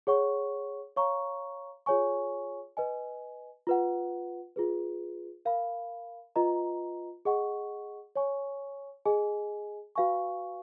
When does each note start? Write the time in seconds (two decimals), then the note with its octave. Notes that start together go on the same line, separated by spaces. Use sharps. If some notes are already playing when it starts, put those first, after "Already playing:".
0.07 G#4 C#5 F#5 C#6
0.97 C#5 F5 A#5 C#6
1.86 F4 G#4 C#5 G#5 C#6
2.77 B4 D#5 G#5
3.67 F4 B4 F#5
4.56 F4 G#4 B4
5.45 A#4 F5 B5
6.36 F4 B4 D#5 A#5
7.25 G#4 D#5 F#5 C#6
8.16 C#5 G#5 C#6
9.05 G#4 D#5 G#5
9.96 F#4 B4 F5 G#5 C#6